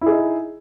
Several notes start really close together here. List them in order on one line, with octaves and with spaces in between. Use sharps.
E4 G#4 D#4